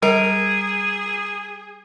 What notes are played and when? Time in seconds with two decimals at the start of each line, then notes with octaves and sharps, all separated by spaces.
0.02 G3 G#4 A#4